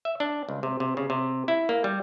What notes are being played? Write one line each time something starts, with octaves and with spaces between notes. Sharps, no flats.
E5
D4
C#2
C3
C3
C#3
C3
E4
A#3
G3